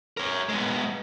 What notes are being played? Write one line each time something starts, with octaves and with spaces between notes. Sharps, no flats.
A#4 C#5
G#3 B3